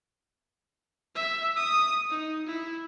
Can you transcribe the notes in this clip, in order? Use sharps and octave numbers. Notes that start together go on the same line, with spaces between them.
E5
D#6
D#4
E4